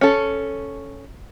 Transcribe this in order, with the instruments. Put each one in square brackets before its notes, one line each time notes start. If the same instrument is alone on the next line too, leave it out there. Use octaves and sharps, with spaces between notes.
[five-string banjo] C#4 A4